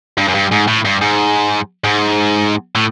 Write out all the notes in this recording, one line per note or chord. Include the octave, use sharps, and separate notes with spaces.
G2
F#2
G2
G#2
A2
G2
G#2
G#2
A2